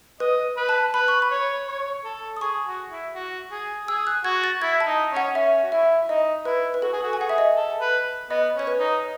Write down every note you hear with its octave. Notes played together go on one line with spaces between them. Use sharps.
B4 D#5
B4
A5
B4 B5
C#6
B5
C#5
C#5
A4
D#6
G#4 C#6
F#4
E4
F#4
G#4
G#4 E6
F#6
F#4 G#6
A6
E4 G#6
A5
D#4
C#4
F#5
C#4 E5
F#4
E4 E5
D#4 D#5
E4 B4
B4
F#4 A4
G#4
F#4 A4
G#5
G#4 F#5
E5
D#5
A4
B4
B3 D#5
C#4 C#5
B4
D#4